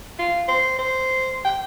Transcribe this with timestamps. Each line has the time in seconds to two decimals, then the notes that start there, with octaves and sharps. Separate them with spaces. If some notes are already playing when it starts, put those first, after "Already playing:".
0.19 F4
0.49 C5
0.79 C5
1.44 G5